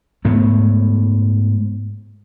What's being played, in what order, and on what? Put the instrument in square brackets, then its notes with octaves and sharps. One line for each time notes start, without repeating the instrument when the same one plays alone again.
[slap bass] G#2 A3 B3